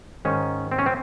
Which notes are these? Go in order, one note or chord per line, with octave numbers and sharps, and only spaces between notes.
G#2 D#3 C#4
C4
C#4
C4